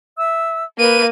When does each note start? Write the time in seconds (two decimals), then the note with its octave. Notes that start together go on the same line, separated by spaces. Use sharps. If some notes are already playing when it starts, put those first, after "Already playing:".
0.18 E5 E6
0.78 A#3 B4 D#7